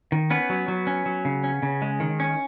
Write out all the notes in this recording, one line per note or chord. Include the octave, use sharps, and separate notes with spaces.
D#3
B3 C#4 B4
F#3
F#3
C#4
F#3
C#3
C#4
C#3
G#3
D#3
C#4